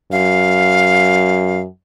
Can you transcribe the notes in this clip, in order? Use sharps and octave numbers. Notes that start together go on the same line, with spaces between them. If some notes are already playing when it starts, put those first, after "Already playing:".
F#2 F5